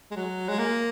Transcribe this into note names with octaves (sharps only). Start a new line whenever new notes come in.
G#3
F#3
G#3
A#3